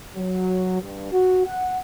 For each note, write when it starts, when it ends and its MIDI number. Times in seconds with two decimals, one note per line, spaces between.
0.17 0.79 54
0.80 1.09 43
1.12 1.46 66
1.46 1.77 78